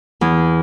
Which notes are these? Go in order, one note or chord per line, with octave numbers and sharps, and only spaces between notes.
E2